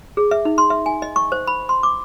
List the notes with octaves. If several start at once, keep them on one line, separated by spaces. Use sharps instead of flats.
G#4
E5
D#4
C6
E5
G#5
D#5
C#6
C5
B5
C6
D6